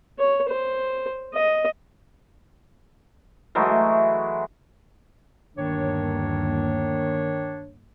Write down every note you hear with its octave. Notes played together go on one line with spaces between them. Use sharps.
C#5
C5
D#5
E3 F#3 G#3 A3
G1 D#2 D#3 A#3 D4 C#5